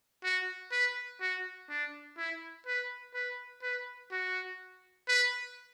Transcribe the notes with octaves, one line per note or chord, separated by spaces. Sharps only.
F#4
B4
F#4
D4
E4
B4
B4
B4
F#4
B4